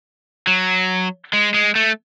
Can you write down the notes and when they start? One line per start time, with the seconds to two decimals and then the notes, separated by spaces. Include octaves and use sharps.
0.47 F#3
1.33 G#3
1.54 G#3
1.75 A3